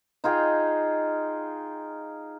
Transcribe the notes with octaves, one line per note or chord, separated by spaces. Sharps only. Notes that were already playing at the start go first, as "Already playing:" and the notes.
D#4 F4 G#4 G5